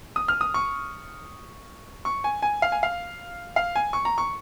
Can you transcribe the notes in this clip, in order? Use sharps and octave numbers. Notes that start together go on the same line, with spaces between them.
D#6
F6
D#6
C#6
C#6
G#5
G#5
F5
G#5
F5
F5
G#5
C#6
A#5
C#6